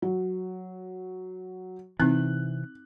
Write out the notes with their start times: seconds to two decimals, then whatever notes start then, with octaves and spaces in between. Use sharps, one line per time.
0.02 F#3
2.00 C3 E3 C4 D#4 F#6